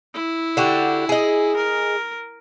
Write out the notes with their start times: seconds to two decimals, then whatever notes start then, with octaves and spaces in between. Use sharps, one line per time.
0.14 E4
0.57 D3 F#4 G4
1.09 G#4 D#5
1.56 A#4